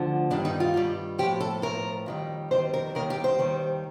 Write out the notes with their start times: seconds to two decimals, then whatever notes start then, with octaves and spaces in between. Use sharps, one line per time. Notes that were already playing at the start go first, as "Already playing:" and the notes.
Already playing: D2 D3 F3
0.30 G2 D#3 G3 D4
0.45 D#4
0.60 F4
0.74 G2 D#3 G3
1.18 F3 G4
1.23 A2
1.40 A4
1.62 A2 F3 A#4
2.06 F2 D#3 G3
2.51 F2 D#3 G3 C5
2.74 A#4
2.95 D#2 D#3 G3 A#4
3.10 G4
3.24 C5
3.39 D#2 D#3 G3